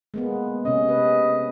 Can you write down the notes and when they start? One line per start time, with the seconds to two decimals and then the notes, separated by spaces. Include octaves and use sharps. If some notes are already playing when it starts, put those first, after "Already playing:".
0.14 G#3 A#3 B3
0.65 C3 C#4 D#5
0.89 B4